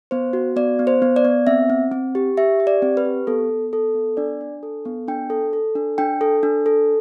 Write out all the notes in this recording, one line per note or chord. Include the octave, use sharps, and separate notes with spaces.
B3 C5
F#4
B3 D5
B3
C5
B3
D5
B3
C4 E5
C4
C4
G4
G4 E5
G4
D5
C4
B4
G4
B3 A4
B3
A4
B3
D4 D5
D4
A4
B3
D4 G5
A4
A4
D4
D4 G5
A4
D4
A4